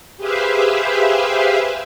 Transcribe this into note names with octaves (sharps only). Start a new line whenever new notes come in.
G4 G#4 B4 C5 E5 F5